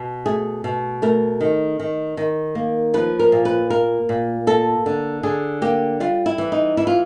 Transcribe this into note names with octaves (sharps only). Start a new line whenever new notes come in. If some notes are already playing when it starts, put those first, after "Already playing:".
Already playing: B2
A3 G#4
B2
A3 A#4
D#3
D#3
D#3
A#3
F3 B4
A#4
A#2
B4
A#3 A#4
A#2
A#3 A4
D3
D3 G#4
A#3 G4
G3 F4
E4
E3
D#4
E3 E4
F4